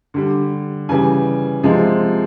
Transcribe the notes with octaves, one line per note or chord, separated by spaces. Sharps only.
D3 G3
C#3 E3 G3 G#5
C3 F3 G#3